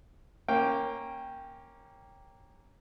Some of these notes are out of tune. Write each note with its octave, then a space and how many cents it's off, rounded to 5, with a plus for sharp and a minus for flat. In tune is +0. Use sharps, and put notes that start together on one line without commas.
A#3 +0 C#4 -15 G5 +0